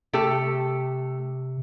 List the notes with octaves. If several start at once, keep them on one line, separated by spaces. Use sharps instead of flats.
C3 A3 G4 A4